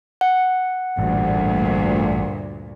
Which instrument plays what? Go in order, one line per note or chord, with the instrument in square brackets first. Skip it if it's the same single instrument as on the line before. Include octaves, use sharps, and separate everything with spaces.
[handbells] F#5
[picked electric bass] A1 [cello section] D2 G2 A#2